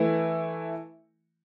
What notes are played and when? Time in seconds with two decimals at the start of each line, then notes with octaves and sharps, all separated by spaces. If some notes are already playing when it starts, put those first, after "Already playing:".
Already playing: E3 A3 E4